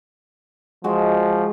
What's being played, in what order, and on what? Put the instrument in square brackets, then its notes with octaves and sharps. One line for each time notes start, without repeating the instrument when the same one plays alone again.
[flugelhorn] F3 [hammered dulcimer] G#3 F#4